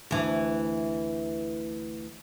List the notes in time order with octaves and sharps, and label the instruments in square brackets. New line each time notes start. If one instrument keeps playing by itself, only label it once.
[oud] D2 E3